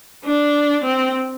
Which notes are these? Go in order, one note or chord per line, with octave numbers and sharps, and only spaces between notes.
D4
C4